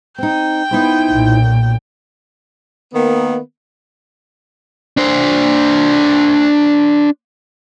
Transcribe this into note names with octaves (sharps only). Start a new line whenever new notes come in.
C4 D#4 G5
B3 D#4 E4 C5
B1 A#2
D#3 A#3 B3
D4 C5